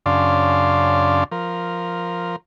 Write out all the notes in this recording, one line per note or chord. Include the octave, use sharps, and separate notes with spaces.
F#2 C#3 D4 D5 F5 C6
F3 A#4